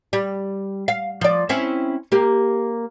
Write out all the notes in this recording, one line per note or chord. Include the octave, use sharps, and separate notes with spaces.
G3
F5
F3 D5
C4 C#4 E4
A#3 G4